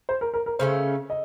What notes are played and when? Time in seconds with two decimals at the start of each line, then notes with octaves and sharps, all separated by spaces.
0.09 C5
0.21 A#4
0.34 A#4
0.46 A#4
0.59 C#3 A3 C#4 C5
1.10 D#5